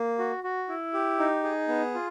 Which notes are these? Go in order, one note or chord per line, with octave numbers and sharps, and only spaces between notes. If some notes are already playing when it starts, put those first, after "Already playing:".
Already playing: A#3
F#4
F#4
E4
G4
D#4
G#4
B3
F4